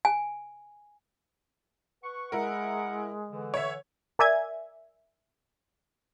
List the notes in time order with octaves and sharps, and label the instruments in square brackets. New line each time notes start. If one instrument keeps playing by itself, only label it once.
[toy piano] G#5
[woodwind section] B4 F#5 C#6
[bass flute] G#3 [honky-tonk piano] E4 A#4 [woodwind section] F#5
[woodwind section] D3 E3
[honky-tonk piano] C#5 E5
[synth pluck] A#4 D5 E5 G#5 G#6